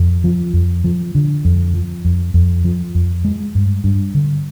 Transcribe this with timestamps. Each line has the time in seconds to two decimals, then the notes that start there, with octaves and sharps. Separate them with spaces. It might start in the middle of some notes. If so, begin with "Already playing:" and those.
Already playing: F2
0.24 F3
0.53 F2
0.84 F3
1.15 D3
1.45 F2
1.74 F3
2.05 F2
2.34 F2
2.64 F3
2.95 F2
3.25 G#3
3.55 G2
3.84 G2
4.14 D3